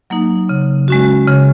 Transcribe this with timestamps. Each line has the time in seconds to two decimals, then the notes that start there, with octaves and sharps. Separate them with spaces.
0.10 F#3 A#3 D#4
0.49 C#3
0.88 G#3 C#4 F#4
1.28 C#3